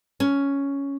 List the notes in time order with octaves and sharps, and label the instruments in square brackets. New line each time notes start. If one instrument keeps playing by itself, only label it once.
[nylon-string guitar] C#4